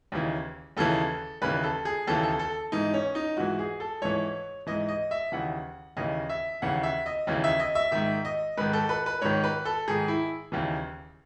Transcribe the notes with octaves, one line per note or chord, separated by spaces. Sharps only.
D#2 C#3 E3
D#2 C#3 E3 A4
D#2 C#3 E3 B4
A4
G#4
D#2 C#3 E3 A4
A4
A4
G#2 E3 D#4
C#4
D#4
G#2 E3 F#4
G#4
A4
G#2 E3 C#5
G#2 E3 D#5
D#5
E5
D#2 C#3 E3 F#5
D#2 C#3 E3 D#5
E5
D#2 C#3 E3 F#5
E5
D#5
D#2 C#3 E3
E5
D#5
E5
G#2 D#3 E5
D#5
G#2 D#3 B4
A4
B4
B4
G#2 D#3 C#5
B4
A4
G#2 D#3 G#4
E4
D#2 C#3 E3